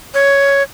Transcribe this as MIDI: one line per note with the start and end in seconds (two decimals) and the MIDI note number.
0.14 0.63 73